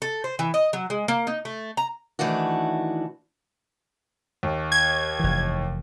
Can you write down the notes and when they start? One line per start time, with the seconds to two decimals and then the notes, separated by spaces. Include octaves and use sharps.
0.02 A4
0.24 C5
0.39 E3
0.54 D#5
0.73 F#3
0.90 G#3
1.08 A#3
1.27 D#4
1.45 A3
1.77 A#5
2.19 D#3 E3 A3 D4 F#4
4.43 D#2
4.72 G#6
5.19 F1 E3